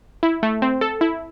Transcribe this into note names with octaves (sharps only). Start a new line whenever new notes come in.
E4
A3
C4
A4
E4